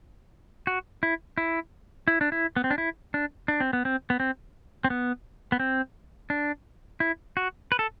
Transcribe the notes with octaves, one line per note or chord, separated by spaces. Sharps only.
F#4
E4
E4
E4
D4
E4
B3
C4
D4
E4
D4
D4
C4
B3
C4
B3
C4
C4
B3
B3
C4
D4
E4
F#4
B4
A4